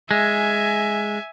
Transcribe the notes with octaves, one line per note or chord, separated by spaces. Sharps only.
G#3 E5 G#5